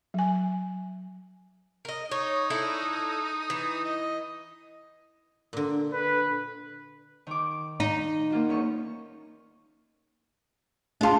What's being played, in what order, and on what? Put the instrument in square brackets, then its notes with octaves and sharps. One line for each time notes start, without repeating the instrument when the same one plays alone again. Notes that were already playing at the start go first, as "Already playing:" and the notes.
[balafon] F#3 G#5
[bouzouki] A#4 D#5
[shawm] D#4 [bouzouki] C#5
[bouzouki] D4 E4 A4
E3
[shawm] D#5
[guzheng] A#2 D3
[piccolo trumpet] B4
[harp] D#3 D6
[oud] D#4
[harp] A#3 F4 F#4
E2 C#4 C#6
[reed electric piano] A3 G#4 A5 [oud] D4 F4